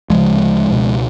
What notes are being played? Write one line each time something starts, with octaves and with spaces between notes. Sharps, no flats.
D2 C#3 F3 G#3
C#2 B2